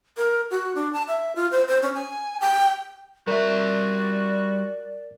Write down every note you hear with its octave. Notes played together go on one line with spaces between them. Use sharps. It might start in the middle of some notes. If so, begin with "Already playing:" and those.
A#4
F#4
D4
A5
E5
F4
C5
C5
C#4
G#5
G5
G3 F#4 A#4 D5 E5